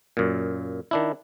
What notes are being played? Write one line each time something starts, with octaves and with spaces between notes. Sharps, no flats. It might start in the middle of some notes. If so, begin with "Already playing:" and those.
F#2 A#2
D#3 D4 E4